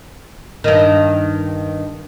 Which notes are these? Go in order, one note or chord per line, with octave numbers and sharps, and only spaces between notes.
G2 D#3